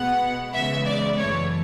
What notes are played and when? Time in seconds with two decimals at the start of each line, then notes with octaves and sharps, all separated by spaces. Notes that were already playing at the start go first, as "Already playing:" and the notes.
Already playing: B2 G#3 B3 F#5
0.52 C#3 E3 G#3 B3 E5
0.85 D5
1.17 F#2 E3 A3 C#5